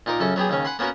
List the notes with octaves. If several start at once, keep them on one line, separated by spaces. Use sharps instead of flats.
A#2 D#4 A#4 D6
F#2 C#3 A4
F#3 B3 G4 G#4
D#2 C#3 C#4
F#5 G#5 B5 C6
A#3 B3 C#4 F#4 A#4